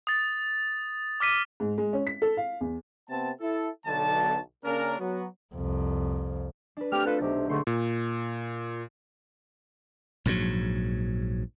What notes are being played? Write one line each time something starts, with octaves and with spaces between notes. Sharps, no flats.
D#6 A6
D6 F6 B6 D#7
G#2
G#3
C#4
B6
A4
F5
E2
C3 B3 C4 A5
E4 A4
B1 D3 A5
C#3 A#3 C#4 D4 A#4
F#3 B3 F#4
C2 F2
D4 B4
A3 C4 G4 F6
F4 A4 B4
B1 C3 G4
G#2 D3 A3 C6 C#6
A#2
A#1 G#2 C3 F#3